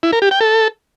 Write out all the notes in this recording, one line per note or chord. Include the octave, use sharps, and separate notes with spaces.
E4
A#4
G4
G5
A4